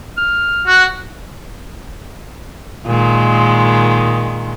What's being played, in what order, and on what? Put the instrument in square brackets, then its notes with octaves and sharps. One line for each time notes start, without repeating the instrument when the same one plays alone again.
[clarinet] F6
[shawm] F#4 [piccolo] F#6
[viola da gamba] A#2 D#3 G#3